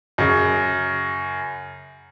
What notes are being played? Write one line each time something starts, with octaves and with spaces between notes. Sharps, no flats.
F#2 C#3